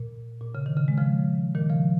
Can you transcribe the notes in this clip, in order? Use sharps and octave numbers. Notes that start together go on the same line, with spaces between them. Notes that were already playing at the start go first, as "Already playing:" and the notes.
Already playing: A#2
A#2
C#3
D#3
C#3
G#3
C#3 F3
A#2 D#3
C#3 F3